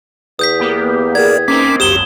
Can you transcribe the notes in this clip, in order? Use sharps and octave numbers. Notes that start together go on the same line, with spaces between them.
E2 D#6 G6 B6
A#3 B3 G4
G#4 A#4 D5 G#6
A#3 C4 C#4 D#4 D6 B6
G#1 C#2 F#2 G4 D#6 E7 G7